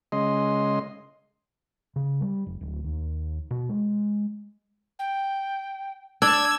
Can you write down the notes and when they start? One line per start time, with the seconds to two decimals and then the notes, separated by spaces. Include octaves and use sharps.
0.12 C#3 G#3 D#5 C6
1.96 C#3
2.21 G3
2.47 F1
2.61 D1
2.84 D#2
3.51 B2
3.69 G#3
4.99 G5
6.22 D4 D5 E6 G#6